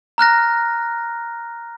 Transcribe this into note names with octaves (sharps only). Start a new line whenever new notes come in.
A#5 F6 F#6 A#6